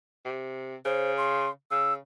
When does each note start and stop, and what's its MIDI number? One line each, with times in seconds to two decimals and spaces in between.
0.25 0.76 48
0.85 1.47 49
0.85 1.13 72
1.17 1.50 84
1.71 1.97 49
1.71 1.94 88